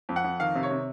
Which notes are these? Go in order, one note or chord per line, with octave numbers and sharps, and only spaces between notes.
F2
F#5
F2
D#3 F5
C3
C#5
C3